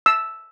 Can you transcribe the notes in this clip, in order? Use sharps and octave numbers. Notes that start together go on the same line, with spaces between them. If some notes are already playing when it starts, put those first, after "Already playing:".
E6